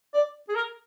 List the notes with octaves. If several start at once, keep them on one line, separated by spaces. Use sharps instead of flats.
D5
G#4
A#4